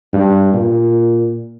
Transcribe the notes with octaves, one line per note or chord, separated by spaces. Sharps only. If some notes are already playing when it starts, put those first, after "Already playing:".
G2
A#2